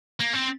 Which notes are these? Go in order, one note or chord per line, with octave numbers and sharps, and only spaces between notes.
A#3
C4